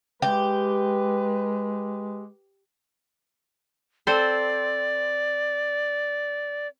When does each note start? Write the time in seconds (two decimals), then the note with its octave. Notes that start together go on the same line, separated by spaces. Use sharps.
0.22 G#3 G4 B4
4.07 C4 A4 C5 D5